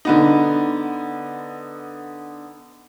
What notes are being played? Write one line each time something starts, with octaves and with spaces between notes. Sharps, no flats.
D3 B3 D#4